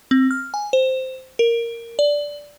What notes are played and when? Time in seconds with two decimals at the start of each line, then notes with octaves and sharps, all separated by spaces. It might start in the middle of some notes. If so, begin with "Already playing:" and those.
0.11 C4
0.31 F6
0.54 G#5
0.73 C5
1.39 A#4
1.99 D5